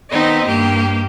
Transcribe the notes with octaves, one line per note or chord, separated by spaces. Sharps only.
D#3 B3 C4 D#4 D#5
G2 A#3 G4